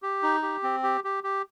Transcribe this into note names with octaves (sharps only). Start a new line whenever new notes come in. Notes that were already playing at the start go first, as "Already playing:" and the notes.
G4
D#4
G4
C4
G4
G4
G4